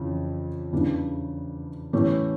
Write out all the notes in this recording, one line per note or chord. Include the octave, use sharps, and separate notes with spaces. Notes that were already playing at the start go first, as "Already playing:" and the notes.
Already playing: F2 C#3 E3
E2 C#3 E3 G3 D4
A2 E3 A3 C#4 G4